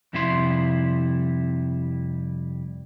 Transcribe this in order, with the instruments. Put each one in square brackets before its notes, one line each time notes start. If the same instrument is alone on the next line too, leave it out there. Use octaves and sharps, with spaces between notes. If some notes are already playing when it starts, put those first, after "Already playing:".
[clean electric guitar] F2 C3 G3 E4 F#4 C6